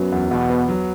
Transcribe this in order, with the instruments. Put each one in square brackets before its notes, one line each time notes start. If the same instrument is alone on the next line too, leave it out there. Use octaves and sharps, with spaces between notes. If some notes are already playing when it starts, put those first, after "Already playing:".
Already playing: [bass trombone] F#2 [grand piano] F#3 B3
[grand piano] E2
[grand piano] E2 [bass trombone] B2
[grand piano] B3
F#3